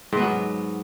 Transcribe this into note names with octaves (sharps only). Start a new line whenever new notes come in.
G#2 F#3 B3